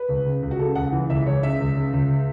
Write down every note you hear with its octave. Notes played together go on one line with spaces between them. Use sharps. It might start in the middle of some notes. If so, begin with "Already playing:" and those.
Already playing: B4
C#2
C#3
C#2
F#4
C#3 A4
C#2 F#5
E3
C#2 E5
C#2 C#5
C#3 E5
C#2
C#3
C#2